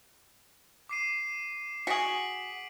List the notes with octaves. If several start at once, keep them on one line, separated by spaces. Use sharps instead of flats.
D6 C7 D#7
F#4 G#4 B6 D7 F#7